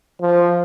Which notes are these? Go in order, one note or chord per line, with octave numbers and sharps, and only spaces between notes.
F3